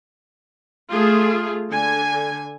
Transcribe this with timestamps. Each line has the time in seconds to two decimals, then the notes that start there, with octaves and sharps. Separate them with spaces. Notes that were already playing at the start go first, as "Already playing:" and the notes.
0.88 A3 F4 G#4
1.69 D3 G#5